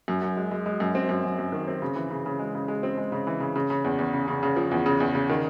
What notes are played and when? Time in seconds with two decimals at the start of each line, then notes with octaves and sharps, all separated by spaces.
0.08 F#2
0.22 F#2
0.37 G#3
0.51 G#3
0.66 G#3
0.80 F#2
0.95 C4
1.09 F#2
1.24 F#2
1.38 F#2
1.52 D#3
1.68 C4
1.82 C#3
1.96 E3
2.11 C#3
2.26 C#3
2.39 G#3
2.55 C#3
2.68 G#3
2.83 C4
2.98 G#3
3.12 C#3
3.27 E3
3.40 C#3
3.56 C#3
3.70 C#3
3.84 E2
3.99 E2
4.13 C#3
4.28 C#3
4.43 C#3
4.56 F3
4.71 E2
4.86 C#3
5.00 E2
5.15 C#3
5.29 D#3